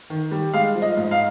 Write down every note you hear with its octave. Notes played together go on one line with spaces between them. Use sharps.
D#3
G3
G#3 F5
F3
D#5
G#2
F5